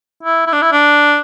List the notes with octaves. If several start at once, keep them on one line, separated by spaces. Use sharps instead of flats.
E4
E4
D4
E4
D4